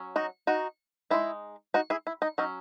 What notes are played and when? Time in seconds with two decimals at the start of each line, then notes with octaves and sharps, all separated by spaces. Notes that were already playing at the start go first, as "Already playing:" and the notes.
Already playing: F#3 C#4
0.16 D#4 F#4
0.47 D#4 F#4
1.10 G#3 D#4 E4
1.74 D#4 F#4
1.90 E4 G#4
2.07 E4
2.22 D#4
2.38 F#3 C#4 D#4